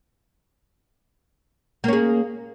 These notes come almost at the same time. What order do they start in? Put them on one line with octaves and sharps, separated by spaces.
A#3 C#4 G#4